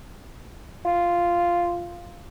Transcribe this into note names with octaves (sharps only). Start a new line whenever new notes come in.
F4